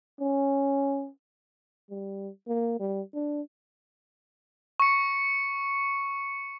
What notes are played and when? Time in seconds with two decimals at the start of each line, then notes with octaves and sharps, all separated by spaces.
0.20 C#4
1.90 G3
2.48 A#3
2.80 G3
3.14 D4
4.80 C#6 C#7